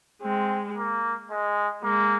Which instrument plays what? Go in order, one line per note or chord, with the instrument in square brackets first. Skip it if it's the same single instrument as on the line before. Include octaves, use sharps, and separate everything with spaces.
[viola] G#3 [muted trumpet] C4
[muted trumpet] A#3
G#3
[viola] G#3 [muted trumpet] A#3